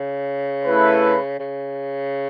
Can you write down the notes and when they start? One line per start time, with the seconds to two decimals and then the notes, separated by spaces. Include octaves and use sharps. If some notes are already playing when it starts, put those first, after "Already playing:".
Already playing: C#3
0.65 A3 E4 B4
1.39 C#3